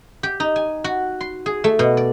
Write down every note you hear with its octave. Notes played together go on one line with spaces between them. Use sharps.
G4
D#4
G#5
F#4
C6
G#4
A3
B2
D5